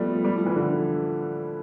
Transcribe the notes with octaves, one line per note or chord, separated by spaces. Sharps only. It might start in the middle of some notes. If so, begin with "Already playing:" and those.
Already playing: F3 G3 A3 B3
G3
F3
E3
D3